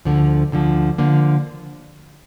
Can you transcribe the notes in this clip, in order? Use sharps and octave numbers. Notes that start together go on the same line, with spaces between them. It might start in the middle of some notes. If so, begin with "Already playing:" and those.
D2 D3 F3
D2 D3 F3
D3 F3 A#3